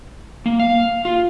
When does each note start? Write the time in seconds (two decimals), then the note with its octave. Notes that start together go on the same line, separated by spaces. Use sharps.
0.46 A#3
0.59 F5
1.05 F4